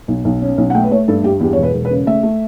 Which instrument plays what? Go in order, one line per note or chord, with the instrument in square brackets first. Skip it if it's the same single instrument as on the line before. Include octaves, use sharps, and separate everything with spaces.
[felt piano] B1
B1
C#4
B1
F#5
A3 G5
B4
A3 C#5
G2 A4
G2 G4
E2 G4
C#5
E1
B4
E1
B4
C#3
A3 E5
A3